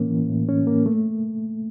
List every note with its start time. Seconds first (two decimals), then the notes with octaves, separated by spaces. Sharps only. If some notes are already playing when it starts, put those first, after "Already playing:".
Already playing: A2 E3 A#3 C#4
0.10 E3
0.29 A2
0.49 C#4
0.67 A#3
0.86 A3